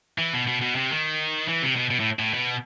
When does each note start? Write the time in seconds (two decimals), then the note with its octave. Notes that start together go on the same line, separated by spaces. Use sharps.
0.18 E3
0.33 B2
0.47 B2
0.61 B2
0.75 C3
0.91 D#3
1.48 E3
1.63 C3
1.76 B2
1.90 B2
2.00 A2
2.19 A2
2.34 B2